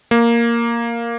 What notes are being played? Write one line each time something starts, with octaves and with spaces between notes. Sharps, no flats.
A#3